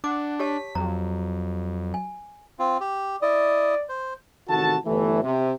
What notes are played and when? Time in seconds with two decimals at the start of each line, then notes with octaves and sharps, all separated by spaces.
0.04 D4 F#5 D6
0.40 G4 C#5 A5 B6
0.75 F2 F#3 A#5
1.94 G#5
2.59 C4 F4
2.81 G4
3.22 E4 D5 D#5
3.89 C5
4.49 A1 C3 D#3 F#4 A4 A5
4.86 G1 E3 A3
5.23 C3